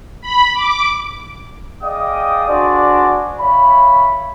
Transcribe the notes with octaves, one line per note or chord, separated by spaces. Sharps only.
B5
D6
G#4 D5 D#5 F5 G5 D#6
D4 F#4 G#4 C5 D5
C#5 E5 F5 B5